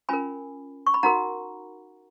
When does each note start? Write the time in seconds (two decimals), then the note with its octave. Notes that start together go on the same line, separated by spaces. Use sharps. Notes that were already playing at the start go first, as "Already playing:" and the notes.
0.09 C#4 F4 A#4 G#5 B5
0.87 C#6
0.94 B5
1.03 D#4 F#4 A#4 F#5 A#5